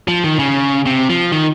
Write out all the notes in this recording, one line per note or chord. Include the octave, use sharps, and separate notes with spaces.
F3
D#3
C#3
C3
F3
D#3